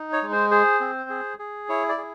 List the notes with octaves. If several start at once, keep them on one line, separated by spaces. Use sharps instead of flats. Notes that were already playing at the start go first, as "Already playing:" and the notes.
Already playing: D#4
C#5
G#3
C5
G#4 C5
C4
G#4
G#4
E4 C#5
D5
G#4